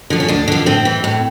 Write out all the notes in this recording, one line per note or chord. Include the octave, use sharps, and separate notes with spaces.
D3 F3
C#4
D2 D4
D3 F3
A2 C4
E3
A2